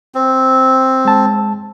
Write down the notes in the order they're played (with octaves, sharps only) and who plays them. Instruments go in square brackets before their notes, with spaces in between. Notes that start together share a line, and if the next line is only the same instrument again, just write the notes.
[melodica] C4
[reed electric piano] G#3 A5